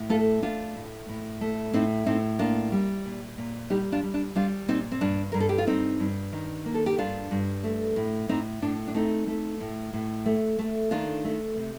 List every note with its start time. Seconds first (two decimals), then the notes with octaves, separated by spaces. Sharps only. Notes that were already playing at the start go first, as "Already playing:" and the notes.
Already playing: A2
0.09 A3 F4 A4
0.42 A3 D4 F4
0.75 A2
1.09 A2
1.41 A3
1.73 A2 C4 D#4
2.06 A2 C4 D#4
2.39 A#3 D4 F4
2.72 G3
3.05 A#2
3.38 A#2
3.70 G3 D#4 G4
3.92 D4 F4
4.03 G3
4.14 D4
4.35 G3 D4 F4
4.68 A#2 C4 D#4
4.92 C4
5.01 G2 D4
5.32 G2 A#4
5.40 A4
5.49 G4
5.58 F4
5.67 G2 C4 D#4
6.00 G2
6.32 D#3
6.66 A#3
6.74 A4
6.86 G4
6.98 G2 D4 F4
7.31 G2
7.64 A3
7.96 A2
8.29 A2 C4 D#4
8.62 A2 D4
8.88 D4
8.94 A3 C4 D#4
9.27 A3
9.60 A2
9.93 A2
10.26 A3
10.59 A3
10.91 D#3 D4 F4
11.24 A3
11.57 C3